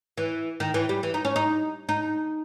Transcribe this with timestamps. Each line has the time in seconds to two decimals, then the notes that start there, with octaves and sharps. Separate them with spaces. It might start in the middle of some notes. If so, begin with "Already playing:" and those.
0.18 E3
0.60 D#3
0.74 E3
0.89 G3
1.03 E3
1.14 D#4
1.25 C#4
1.36 D#4
1.89 D#4